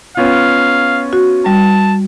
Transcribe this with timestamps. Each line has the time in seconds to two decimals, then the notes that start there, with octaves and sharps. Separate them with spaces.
0.17 B3 C#4 F4 F5
1.13 F#4
1.46 G3 A5